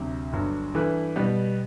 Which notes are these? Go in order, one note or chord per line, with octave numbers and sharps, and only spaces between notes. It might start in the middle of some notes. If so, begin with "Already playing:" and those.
Already playing: D2 C3 F#3
G1 G2 F#3
G2 E3 A3 E4 B4
B2 G3 B3